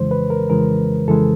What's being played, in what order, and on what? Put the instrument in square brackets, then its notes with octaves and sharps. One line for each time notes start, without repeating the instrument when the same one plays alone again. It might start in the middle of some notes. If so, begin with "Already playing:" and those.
Already playing: [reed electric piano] F2 C#3 E3 G#3 C5
B4
A#4
F2 C#3 E3 G#3 A#4
F2 C#3 E3 G#3 A4